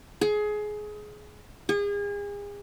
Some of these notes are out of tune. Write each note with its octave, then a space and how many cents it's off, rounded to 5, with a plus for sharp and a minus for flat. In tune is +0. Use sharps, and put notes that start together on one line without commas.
G#4 +20
G#4 -35